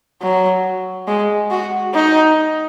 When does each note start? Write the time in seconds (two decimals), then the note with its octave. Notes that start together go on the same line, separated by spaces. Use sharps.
0.22 F#3
1.08 G#3
1.51 F#4
1.94 D#4